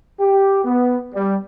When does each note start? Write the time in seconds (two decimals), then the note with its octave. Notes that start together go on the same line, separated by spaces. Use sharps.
0.20 G4
0.65 B3
1.13 G3